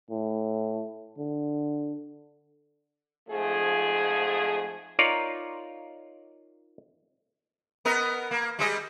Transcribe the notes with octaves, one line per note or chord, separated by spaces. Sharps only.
A2
D3
F2 G#2 F3 A3 G#4
D#4 F4 A#4 C#5 D5
B3 A#4 D#5
A#3
G3 G#3 D#5